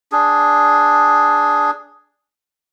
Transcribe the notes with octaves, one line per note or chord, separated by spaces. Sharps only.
D4 G#4